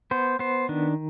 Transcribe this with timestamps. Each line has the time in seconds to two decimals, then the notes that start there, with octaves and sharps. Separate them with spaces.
0.11 B3 C5
0.39 B3 C5
0.69 D#3 D4